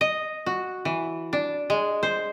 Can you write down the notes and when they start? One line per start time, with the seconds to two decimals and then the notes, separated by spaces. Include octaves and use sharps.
0.01 D#5
0.46 F#4
0.85 E3
1.33 D4
1.70 G#3
2.03 C5